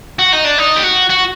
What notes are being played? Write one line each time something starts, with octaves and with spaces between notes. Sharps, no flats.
F#4
D#4
D4
D#4
G4
F#4
F#4